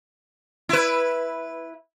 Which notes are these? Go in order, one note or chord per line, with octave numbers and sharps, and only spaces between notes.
E4 B4